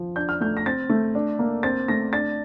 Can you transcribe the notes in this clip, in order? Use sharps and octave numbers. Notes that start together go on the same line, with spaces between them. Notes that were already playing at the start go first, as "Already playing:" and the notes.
Already playing: F3
D4 G6
F6
A3 G6
A#6
C4 A6
A3
D4
A#3
C4 A6
A3 A#6
D4 A6